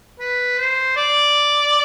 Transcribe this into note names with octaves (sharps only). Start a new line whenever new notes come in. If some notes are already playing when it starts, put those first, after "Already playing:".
B4
C5
D5